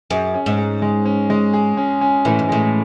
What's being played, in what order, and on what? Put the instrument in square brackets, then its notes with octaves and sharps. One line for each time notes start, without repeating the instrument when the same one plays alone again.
[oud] F#2 [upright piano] G#4
[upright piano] C#4
[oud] G#2
[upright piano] G#4
G#3
C#4
G#3
G#4
C#4
C#4
[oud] A2 [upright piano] E3
[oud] G#2
[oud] A2 [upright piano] G#3